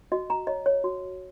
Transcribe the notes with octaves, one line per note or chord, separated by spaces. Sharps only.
F#4 D#5
A#5
C#5 D#5
C#5
F#4